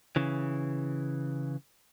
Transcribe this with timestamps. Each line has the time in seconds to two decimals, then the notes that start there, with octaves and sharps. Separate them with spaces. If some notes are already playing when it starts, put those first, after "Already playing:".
0.16 C#3 E3